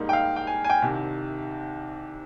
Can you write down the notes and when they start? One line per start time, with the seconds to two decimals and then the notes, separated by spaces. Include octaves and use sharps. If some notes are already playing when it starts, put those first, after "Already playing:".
Already playing: G#2 G3 A#3 D#4
0.09 G5
0.13 F5
0.36 G5
0.47 G#5
0.64 G#5
0.70 G5
0.82 C2 C3 D#3